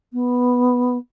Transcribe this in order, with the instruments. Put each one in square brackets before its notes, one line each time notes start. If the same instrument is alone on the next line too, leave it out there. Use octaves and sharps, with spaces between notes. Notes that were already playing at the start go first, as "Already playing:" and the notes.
[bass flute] B3